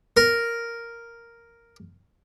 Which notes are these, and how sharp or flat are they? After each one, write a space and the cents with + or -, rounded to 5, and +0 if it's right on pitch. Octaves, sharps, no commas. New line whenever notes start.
A#4 +0